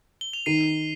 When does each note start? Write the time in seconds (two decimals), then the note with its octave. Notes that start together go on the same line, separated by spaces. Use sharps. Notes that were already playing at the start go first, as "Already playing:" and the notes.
0.21 G7
0.33 F7
0.46 D#3 C7 D#7